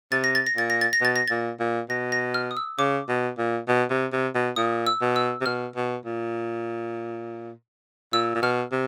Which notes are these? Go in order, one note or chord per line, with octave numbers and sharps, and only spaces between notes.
C3 A6
A#6
A6
A#6
A#2 A6
A#6
A6
A#6
B2 A6
A#6
A#2 A6
A#2
B2 A#6
A#6
F6
D#6
E6
C#3 D6
B2
A#2
B2
C3
C3
B2
A#2 D#6
E6
B2
E6
C3
B2 F6
B2
A#2
A#2 E6
A#2
B2 F6
C3